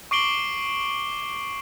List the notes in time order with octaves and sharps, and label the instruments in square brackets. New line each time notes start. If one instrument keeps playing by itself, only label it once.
[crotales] C#6 D6 C7 D7 F#7 G7